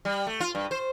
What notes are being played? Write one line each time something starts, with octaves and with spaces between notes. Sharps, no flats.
G3
A3
F4
G2
C5